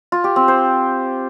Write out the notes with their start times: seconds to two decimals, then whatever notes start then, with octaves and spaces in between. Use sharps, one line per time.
0.12 F4
0.24 G4
0.36 C4
0.48 C5